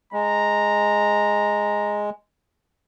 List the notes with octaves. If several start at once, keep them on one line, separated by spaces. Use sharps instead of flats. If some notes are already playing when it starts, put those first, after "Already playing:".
G#3 A#5